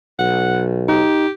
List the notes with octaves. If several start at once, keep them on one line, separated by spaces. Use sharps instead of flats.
B1 F#5
D#4 G4